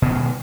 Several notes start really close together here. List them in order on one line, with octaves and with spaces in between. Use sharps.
B2 D#3 F3 G#3